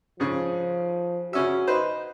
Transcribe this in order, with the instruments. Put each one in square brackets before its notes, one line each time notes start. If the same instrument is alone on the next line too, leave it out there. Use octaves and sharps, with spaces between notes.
[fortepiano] G#2 C#3 [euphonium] F3
[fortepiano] C#3 C#4 E5 [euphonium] F#4
[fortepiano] D#4 B4 C5